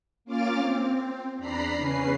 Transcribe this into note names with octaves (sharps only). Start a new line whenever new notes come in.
A#3 C#4 F4 D6 F6 A6
C4
E2 D4 A#5 B5 C7
E2 C#3 C#4 B4 C7